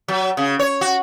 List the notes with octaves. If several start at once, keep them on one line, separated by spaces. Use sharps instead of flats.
F#3
C#3
C#5
F#4